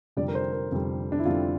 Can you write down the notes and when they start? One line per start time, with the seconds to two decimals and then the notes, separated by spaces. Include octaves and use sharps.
0.17 F1 F2 D3 G3 D5
0.28 A#4
0.35 C5
0.52 A#4
0.71 F1 F2 D3 G3
1.12 D4
1.19 E4
1.25 F1 F2 D3 G3 F4